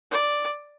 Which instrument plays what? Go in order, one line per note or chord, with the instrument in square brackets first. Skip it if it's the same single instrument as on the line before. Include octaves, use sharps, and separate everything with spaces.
[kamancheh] D5